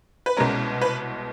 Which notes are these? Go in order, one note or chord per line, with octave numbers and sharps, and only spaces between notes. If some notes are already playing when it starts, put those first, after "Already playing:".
B4
C2 B2 G#3 C#4 A#4
B4